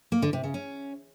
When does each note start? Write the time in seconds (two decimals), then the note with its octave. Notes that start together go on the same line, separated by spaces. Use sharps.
0.12 A#3
0.22 D3
0.33 C3
0.44 C#3
0.54 C#4